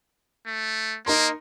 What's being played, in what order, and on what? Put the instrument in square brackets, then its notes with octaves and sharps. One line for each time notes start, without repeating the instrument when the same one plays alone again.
[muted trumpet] A3
[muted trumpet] A#3 [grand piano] D#4 A#4 C6